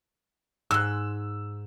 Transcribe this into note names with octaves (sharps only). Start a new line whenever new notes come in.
G#2 C6 E6 F#6